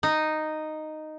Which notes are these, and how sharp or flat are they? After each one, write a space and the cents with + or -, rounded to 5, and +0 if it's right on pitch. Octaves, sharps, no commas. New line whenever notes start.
D#4 -5